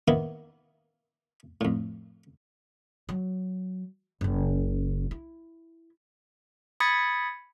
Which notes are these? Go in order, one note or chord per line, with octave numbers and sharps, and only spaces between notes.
D#3 A#3 B3 D#4 E4
F2 A2
F#3
F#1 C#3
E4
B5 D#6 G#6 A6 B6 C#7